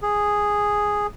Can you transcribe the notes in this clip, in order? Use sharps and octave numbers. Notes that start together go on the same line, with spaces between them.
G#4